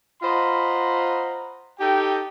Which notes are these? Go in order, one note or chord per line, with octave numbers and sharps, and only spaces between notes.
F4 C5 D#5 F#5 A#5 B5
D#4 G4 A4 G5